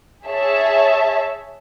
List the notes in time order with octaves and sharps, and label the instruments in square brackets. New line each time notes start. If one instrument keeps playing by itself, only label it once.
[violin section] G#4 C#5 E5 A5